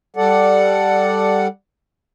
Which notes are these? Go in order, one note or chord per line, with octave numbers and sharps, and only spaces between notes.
G3 A4 D5 F#5